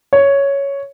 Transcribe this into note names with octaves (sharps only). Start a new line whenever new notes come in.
C#5